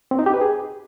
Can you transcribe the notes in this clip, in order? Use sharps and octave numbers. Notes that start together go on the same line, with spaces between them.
C4
D#4
G4
B4
G#4